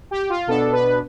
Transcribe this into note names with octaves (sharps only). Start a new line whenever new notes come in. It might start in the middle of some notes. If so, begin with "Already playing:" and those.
G4
F4
B2 B3 D4 A4
B4